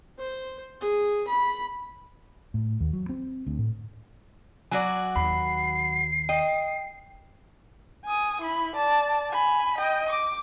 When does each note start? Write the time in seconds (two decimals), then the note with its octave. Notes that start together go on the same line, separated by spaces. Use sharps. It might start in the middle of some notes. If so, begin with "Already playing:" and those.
0.18 C5
0.81 G#4
1.28 B5
2.54 A2
2.80 D#2
2.93 F#3
3.09 C4
3.47 D2
3.59 A2
4.71 F#3 F#4 D5 G#5
5.16 D#2 B5 C7
6.29 D#5 G5
8.06 G#5 D#6
8.42 E4 B5
8.76 D5 A5
9.32 G#5 B5
9.79 D#5 G5
10.10 D6